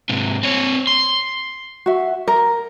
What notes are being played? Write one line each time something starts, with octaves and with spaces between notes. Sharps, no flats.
G#2 C3
C4 C#5
C6
F#4 E5
A#4